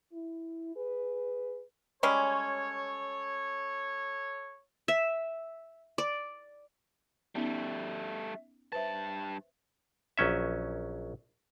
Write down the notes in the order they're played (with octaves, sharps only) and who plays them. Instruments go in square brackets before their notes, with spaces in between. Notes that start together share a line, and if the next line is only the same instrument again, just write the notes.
[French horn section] E4
G#4 B4
[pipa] G3 G#3 C#4 [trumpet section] A4 C#5
[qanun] E5
D5
[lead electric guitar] G3 A3 [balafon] B3 C#4 D#4
[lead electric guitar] G2 A5 [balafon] B4 C5 E5
[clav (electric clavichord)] A#1 F#3 C#4 E5